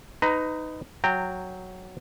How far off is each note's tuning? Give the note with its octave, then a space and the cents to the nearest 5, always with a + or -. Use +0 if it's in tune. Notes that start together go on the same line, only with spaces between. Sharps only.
D#4 +0 B4 +30 A#5 +0
F#3 +0 G5 +5 A#5 -20